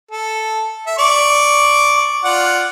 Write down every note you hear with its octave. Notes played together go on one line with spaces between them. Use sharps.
A4
E5
D5 C#6 D6
F4 D5 F#5